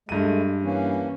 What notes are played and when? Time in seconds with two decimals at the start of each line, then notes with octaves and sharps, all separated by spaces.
0.09 G2 G#3 A3 D#7
0.63 E3 A#3 C#4